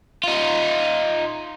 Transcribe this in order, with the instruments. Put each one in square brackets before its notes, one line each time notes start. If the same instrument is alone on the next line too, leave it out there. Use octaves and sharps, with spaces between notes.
[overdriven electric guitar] D#4 F4